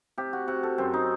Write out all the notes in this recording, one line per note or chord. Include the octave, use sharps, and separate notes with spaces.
C3 G4
F#4
C3 F#4
A4
F#2 C4
D#4